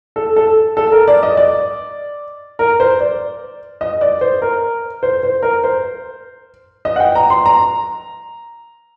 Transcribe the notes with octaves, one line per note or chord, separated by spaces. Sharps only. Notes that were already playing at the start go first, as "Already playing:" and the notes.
A4
A4
A4
A#4
D5
D#5
D5
A#4
C5
D5
D#5
D5
C5
A#4
C5
C5
A#4
C5
D#5
F#5
G5
A#5
C6
A#5